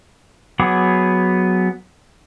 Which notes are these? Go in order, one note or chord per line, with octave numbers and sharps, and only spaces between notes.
F#3 B3 G#4 F#5 D6